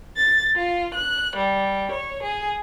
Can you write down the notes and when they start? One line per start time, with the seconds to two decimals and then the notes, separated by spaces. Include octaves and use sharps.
0.17 A6
0.56 F4
0.94 F#6
1.36 G3
1.91 C#5
2.23 G#4